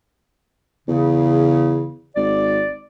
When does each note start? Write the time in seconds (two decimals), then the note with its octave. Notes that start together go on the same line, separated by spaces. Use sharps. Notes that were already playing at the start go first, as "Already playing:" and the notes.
0.88 E2 C#3
2.16 G#1 D5